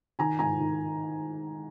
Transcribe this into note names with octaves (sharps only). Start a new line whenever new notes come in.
D#3 G#5 A#5
G#2 G#5 A#5
D#3